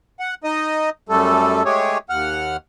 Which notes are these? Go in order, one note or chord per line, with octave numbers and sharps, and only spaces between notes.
F#5
D#4 D#5 D#6
F#2 G3 A3 A4
G#3 A3 G4 G#4 C#5
D#2 F#5 F6